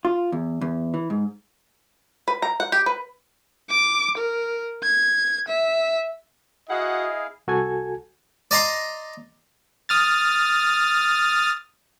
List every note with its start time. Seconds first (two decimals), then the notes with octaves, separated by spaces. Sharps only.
0.05 F4
0.32 E2
0.61 E2
0.94 E3
1.10 G#2
2.28 B4
2.42 A#5
2.60 F#5
2.72 G4
2.86 B4
3.70 D6
4.18 A#4
4.83 G#6
5.48 E5
6.69 E4 F#4 G#4 D#5 F5 F#5
7.47 C2 F#4 A4 G#5 G#6
8.51 D5 D#5 A#5 C6 D6
9.89 D#6 F6 A6